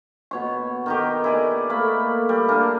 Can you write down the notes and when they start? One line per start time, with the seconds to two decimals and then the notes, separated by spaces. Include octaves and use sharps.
0.31 B2 C#5 C#6
0.86 D#3 D#4 G4
1.24 E4 G#4 D5
1.70 A3 A#3 B5
2.29 G3
2.48 A#3 D4 G#4 A#4